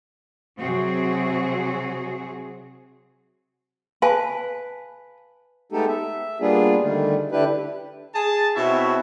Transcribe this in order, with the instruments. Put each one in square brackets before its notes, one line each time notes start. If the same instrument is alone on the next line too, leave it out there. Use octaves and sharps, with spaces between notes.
[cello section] C3 F#3 C4 F#4 G#4
[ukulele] B4 [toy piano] F5 G#5 A5
[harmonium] G#3 A3 B3 D#4 G4 A4
E5
G3 A#3 B3 D4 F4 G#4
D3 D#3 G3 A3
D3 D4 E4 G4 B4
[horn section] G#4 A5
B2 C4 E4 F#4 C#5 E5